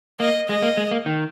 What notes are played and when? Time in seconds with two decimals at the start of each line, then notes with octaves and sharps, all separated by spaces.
0.20 A#3 D#5
0.48 G#3 D#5
0.62 A#3
0.77 G#3
0.91 A#3
1.06 D#3